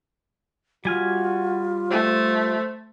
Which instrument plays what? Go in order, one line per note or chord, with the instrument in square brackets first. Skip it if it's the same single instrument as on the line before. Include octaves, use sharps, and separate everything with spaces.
[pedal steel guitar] G3 G#5 F6 [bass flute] F4 [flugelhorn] F#4
[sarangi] A3 [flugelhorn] C5